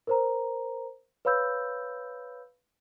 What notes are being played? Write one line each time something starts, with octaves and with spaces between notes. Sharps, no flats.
A#4 C5 A#5
B4 C#5 F5 B5 E6 G6